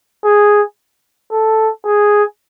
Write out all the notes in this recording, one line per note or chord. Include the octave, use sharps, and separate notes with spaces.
G#4
A4
G#4